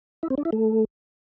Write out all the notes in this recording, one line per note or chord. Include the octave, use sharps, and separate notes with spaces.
E4
C4
D4
E4
A3